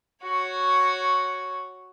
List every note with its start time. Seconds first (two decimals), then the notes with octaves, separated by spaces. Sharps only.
0.23 F#4 C#5